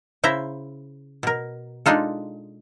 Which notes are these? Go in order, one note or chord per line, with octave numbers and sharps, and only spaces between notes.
C#3 E4 C5 E5 A#5
B2 A#4
G#3 D4 D#4 F4 A4